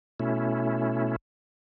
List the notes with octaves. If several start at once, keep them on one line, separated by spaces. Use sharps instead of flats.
B2 A3 C#4 E4